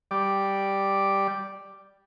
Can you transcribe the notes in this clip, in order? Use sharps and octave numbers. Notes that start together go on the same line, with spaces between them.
G3 D5